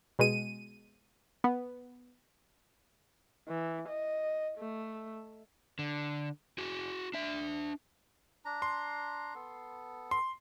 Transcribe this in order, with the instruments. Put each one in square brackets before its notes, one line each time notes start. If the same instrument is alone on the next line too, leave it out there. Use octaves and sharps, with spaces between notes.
[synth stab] B2 G#3 D#7
B3
[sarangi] E3
D#5
A3
[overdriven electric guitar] D3
F#4 G#4
D4 E5
[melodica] D4 A#5
[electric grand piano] C6
[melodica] B3 A4
[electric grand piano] C6